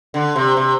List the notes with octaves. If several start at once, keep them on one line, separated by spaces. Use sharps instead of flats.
D3
C3
C3